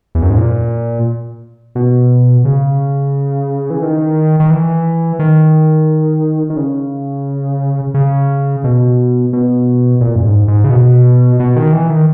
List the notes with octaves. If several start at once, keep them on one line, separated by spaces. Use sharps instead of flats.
E2
F#2
G#2
A#2
B2
C#3
E3
D#3
D#3
E3
D#3
D#3
C#3
C#3
B2
B2
A#2
F#2
G#2
G#2
C#3
B2
B2
D#3
E3
D#3